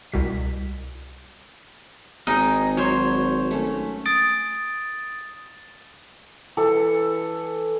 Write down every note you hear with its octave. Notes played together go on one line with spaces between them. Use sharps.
C2 B2 B6
G#1 D#4 G#4 G5
F#3 C5 C#5
A3 C#4
D#6 A6 D7
E3 A4 D6